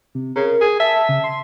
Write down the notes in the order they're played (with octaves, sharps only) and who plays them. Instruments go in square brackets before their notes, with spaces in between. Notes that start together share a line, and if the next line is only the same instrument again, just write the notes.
[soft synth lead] C3
[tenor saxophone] C#3 [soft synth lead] A#4
[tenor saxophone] G#4
[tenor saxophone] E5 [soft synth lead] A5
[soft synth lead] C#3
C6